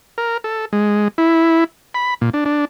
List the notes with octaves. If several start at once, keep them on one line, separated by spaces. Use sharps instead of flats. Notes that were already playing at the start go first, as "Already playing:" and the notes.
A#4
A4
G#3
E4
B5
A#2
D4
D4